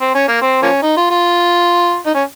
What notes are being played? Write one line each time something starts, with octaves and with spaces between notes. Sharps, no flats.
C4
C#4
A#3
C4
F3 A#3 C#4
D#4
F4
F4
D#4
C#4